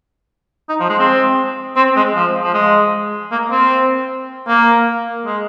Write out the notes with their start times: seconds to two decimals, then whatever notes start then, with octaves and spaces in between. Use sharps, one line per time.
0.69 D#4
0.80 F3
0.89 G#3
0.99 C4
1.76 C4
1.96 G#3
2.15 F3
2.43 F3
2.54 G#3
3.31 A#3
3.51 C4
4.48 A#3
5.26 G#3